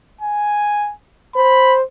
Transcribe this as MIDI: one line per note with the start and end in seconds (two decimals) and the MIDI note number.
0.21 0.92 80
1.36 1.82 72
1.36 1.76 83